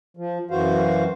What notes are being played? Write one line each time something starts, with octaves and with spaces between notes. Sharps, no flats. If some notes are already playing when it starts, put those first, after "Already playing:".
F3
F#2 E3 F#4 C5 F5